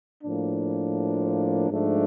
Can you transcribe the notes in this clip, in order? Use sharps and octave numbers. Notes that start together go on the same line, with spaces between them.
A2 F3 A#3 D4
G#2 F3 A3 D4